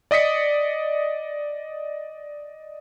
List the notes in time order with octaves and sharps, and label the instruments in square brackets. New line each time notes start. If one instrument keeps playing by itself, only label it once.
[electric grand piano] D5 D#5 D#6 B6 C#7